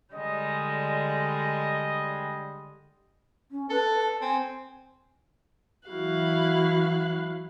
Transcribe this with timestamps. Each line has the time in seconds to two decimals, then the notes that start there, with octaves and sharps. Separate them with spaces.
0.13 D3 G3 G#3 D#5
3.51 C#4
3.70 A4 B4
3.98 A5
4.21 C4 G#5
5.88 E3 F#3 E4 F#4 F5 F#6